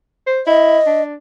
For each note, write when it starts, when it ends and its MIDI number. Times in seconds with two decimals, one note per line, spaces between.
0.27 0.41 72
0.47 0.79 64
0.47 1.02 75
0.86 1.14 62